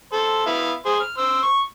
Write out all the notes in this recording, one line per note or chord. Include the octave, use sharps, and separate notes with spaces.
A4 C5
B3 E4 F5
G#4 C5
F6
C5 E6
C#6